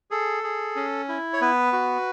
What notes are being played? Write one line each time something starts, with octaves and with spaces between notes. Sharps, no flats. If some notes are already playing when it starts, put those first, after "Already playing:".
G#4 A4
G#4
C#4
E4
C#5
B3 B4
F#4